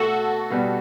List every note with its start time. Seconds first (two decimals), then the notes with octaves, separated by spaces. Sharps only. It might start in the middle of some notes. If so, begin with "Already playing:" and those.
Already playing: B2 A3 F#4 A4
0.50 B2 G3 B3